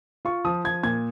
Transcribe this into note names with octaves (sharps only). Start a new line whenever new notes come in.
F4 C#6
F3 D#6
F3 G#6
A#2 G#6